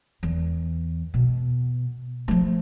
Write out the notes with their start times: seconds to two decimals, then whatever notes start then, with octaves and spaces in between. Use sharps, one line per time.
0.23 E2
1.14 B2
2.28 F3 A3